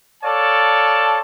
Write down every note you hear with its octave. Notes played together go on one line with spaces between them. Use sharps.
A4 C#5 D5 F5 A5